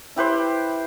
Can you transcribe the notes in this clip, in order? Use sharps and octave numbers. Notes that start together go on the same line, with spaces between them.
E4 G4 B4 C5